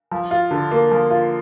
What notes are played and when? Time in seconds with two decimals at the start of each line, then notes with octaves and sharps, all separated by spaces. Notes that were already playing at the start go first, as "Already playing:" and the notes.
0.11 F3
0.31 F4
0.51 D3
0.71 A#3
0.91 F3
1.11 F4